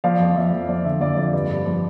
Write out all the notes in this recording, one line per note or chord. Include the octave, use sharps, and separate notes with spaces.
F3 D5 F5
F2
F2 E5
F2
F3 D5
D3 E5
F2 D5 F5
F2 D5
G2 D5
G2
F3